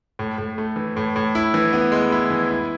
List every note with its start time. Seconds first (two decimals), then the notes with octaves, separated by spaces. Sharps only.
0.19 A2
0.38 A2
0.58 A3
0.76 E3
0.97 A2
1.16 A2
1.35 E4
1.54 E3
1.73 B3
1.92 G#3
2.12 E4
2.31 E3
2.51 E4